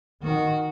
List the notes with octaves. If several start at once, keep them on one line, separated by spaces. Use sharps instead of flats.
D#3 F#4